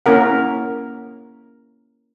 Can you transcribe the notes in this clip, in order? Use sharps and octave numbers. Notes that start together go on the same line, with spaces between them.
A#3 C#4 E4 A#4 F#5